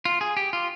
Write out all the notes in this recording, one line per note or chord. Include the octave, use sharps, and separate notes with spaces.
F4
G#4
G4
F4